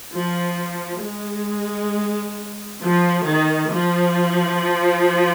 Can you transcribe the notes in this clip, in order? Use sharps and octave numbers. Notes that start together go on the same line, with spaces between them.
F3
G#3
F3
D#3
F3